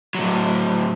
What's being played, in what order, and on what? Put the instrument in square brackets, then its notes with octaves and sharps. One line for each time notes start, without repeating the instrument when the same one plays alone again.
[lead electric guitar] A2 F#3